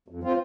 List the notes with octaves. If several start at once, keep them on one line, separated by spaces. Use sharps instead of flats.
F2
C4 F4